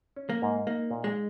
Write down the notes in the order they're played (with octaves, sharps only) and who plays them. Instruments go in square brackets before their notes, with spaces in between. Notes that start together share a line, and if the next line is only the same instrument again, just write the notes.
[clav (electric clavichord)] C#4
[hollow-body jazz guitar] A#3
[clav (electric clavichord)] G#2
[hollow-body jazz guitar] A#3 [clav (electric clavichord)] D#4
[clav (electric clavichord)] A#2
[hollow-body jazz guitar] G#3